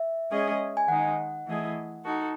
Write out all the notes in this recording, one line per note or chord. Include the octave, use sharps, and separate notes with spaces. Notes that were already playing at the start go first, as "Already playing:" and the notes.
Already playing: E5
G#3 C#4 G#4 D#5
G#5
D#3 G#3 D#4 F#5
E3 A3 E4 G#4 D#5
D#4 F#4 A4